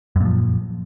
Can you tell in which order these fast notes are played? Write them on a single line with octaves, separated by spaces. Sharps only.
F#2 A#2 F3